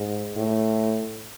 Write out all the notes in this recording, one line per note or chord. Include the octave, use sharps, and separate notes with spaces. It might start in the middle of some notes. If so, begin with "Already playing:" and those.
Already playing: G#2
A2